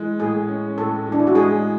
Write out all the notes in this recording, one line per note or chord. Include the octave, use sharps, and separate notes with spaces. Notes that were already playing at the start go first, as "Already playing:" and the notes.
Already playing: E3 G#3
A2 G#4
C#4
A2 A4
E3
D4
E4
F#4
G#3 G#4